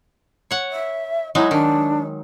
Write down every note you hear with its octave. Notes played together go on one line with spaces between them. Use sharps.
C#5 F#5
E5
F#3 G#3 D#4 E4
D#3 D4